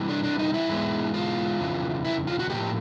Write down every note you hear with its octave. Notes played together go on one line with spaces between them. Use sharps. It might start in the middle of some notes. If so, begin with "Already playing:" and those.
Already playing: C3 E3 G3
D4
D4
D#4
E4
G#2 E3 G#3 B3
F4
F2 C#3 E3
E4
F4
F#4
A2 F3 A#3 G4